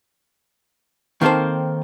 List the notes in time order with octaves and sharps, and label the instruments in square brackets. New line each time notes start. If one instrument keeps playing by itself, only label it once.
[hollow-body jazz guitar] D#3 A#3 C4 A4 C5